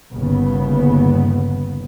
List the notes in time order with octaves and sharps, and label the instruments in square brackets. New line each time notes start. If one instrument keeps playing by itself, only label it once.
[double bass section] G1 D#2 C#3 B3